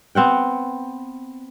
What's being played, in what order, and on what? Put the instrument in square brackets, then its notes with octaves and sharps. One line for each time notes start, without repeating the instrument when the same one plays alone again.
[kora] B3 C4 F#5 G5